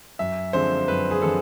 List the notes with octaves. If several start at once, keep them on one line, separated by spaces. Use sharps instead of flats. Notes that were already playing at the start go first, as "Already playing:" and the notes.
F#2 E5
D3 F3 G#3 C4 C5
F#2 B4
G#4
D3 F3 G#3 C4 A4